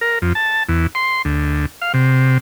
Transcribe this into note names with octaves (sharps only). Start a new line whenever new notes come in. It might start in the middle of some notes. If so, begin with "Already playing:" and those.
A#4
F2
A5
E2
C6
D2
F5
C3